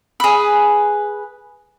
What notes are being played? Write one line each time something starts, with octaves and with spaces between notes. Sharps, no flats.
G#4 B4